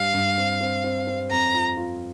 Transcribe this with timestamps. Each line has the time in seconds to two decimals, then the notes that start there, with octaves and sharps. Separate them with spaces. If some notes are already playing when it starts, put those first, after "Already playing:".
Already playing: G2 G3 D4 F5
0.14 G2
0.38 C4
0.61 C4
0.84 C4
1.07 C4
1.30 F2 A#5
1.54 F4
1.77 F4